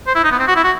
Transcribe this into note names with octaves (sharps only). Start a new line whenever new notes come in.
C5
E4
D#4
B3
C4
F#4
E4
F#4